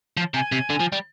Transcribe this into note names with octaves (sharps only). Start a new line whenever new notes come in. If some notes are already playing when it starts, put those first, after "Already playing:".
F3
C3 G#5
C3
D3
F3
G3